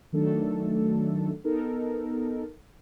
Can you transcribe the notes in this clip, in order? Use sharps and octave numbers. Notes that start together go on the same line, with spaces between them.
D#3 F#3 A3 D4 A4
B3 D#4 A4 A#4